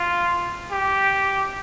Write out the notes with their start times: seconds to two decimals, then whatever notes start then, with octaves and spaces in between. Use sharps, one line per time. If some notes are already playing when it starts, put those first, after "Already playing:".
Already playing: F4
0.71 G4